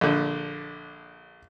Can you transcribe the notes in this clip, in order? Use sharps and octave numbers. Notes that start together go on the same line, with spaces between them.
A#1 D3